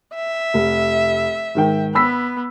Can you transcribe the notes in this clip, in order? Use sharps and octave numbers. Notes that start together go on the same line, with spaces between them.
E5
F1
G#2 D#3 G5
B3 B5 E6 B6